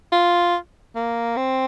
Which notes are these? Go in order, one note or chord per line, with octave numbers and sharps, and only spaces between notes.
F4
A#3
C4